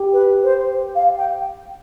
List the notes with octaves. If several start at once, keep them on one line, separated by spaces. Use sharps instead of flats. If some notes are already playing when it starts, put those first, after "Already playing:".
Already playing: G4
B4
C5
F5
G5